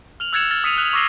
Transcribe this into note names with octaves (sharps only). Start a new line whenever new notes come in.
F6 F7 F#7
E6 F#6 G#6 A6 C#7 E7
F6 A6
D#6 B6 C#7 D#7 F7
F6 F#6 F#7
C#6 D6 E6 A#6 C7 G7